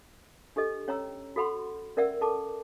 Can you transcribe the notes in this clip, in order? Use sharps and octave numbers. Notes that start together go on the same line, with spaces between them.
D4 G4 A4 D#5
C#4 C#5 G5 A#5 E6
F#4 A4 F#5 B5 C6
C#4 A#4 D5 E5 F#5 E6
A4 A5 D6